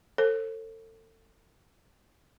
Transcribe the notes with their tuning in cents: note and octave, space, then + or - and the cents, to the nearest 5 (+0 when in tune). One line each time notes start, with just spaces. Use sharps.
A4 +30 C5 +45